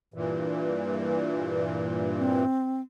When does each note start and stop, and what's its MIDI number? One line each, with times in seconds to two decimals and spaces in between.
0.14 2.45 43
0.14 2.45 46
0.14 2.45 52
2.18 2.81 60